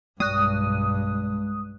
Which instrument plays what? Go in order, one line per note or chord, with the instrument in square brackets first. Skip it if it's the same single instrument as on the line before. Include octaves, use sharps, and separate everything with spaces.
[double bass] B1 G2 [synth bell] G#3 F#6 [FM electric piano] D#6